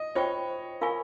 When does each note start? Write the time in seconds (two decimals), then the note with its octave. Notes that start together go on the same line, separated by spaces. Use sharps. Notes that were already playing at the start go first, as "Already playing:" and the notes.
Already playing: D#5
0.15 F4 C5 C#5 G5 C#6
0.81 F4 A#4 F5 G#5 C#6